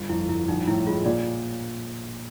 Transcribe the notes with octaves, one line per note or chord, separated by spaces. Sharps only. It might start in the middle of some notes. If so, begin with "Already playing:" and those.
Already playing: G1
F2 E4
G1 E4
A#1 D#4
A2 E4
G#3 F4
A#2 D5